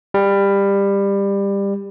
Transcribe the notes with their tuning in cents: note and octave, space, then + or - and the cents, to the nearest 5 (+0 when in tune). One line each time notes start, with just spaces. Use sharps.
G3 +20